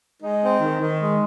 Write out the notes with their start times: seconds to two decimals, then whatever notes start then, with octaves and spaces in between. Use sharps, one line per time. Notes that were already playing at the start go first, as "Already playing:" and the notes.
0.22 G#3 D#4
0.42 C4
0.60 D#3
0.80 D#3
1.00 G#3